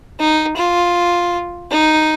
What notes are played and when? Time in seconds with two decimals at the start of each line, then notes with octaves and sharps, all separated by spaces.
0.19 D#4
0.56 F4
1.71 D#4